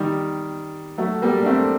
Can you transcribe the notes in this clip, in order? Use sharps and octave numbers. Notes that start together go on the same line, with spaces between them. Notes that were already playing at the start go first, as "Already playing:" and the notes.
Already playing: D#3 G3
F#3 A3
G3 A#3
D4
A3 C4